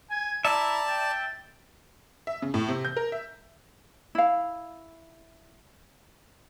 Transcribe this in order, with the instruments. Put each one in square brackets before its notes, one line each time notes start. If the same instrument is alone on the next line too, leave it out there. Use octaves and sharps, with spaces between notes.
[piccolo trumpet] G#5 [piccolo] G#6
[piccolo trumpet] E4 [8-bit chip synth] D5 A5 [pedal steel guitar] E5 [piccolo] A#5
[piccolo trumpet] G5 [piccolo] A6
[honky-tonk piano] E5
C#3
A2
C3
G6
A#4
E5
[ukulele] E4 F5